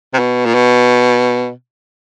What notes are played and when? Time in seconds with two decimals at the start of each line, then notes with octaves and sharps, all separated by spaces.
0.14 C3
0.19 B2
0.45 A#2
0.54 B2